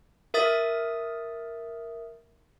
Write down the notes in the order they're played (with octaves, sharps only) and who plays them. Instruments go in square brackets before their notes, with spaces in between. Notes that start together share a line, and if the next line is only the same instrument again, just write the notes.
[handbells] A#4 E5 D#6 A6